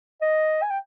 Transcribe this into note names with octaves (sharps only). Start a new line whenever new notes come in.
D#5
G#5
G5